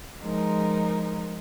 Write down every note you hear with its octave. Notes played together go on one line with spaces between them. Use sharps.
F3 G#3 D#4 A#4